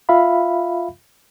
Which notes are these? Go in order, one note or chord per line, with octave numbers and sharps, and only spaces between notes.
F4 E5 F5 B5